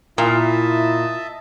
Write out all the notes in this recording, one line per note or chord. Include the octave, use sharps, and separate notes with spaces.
A#2 E4 D#5 E5 A5